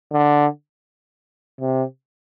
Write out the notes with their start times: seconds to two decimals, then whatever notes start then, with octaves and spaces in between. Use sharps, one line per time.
0.13 D3
1.61 C3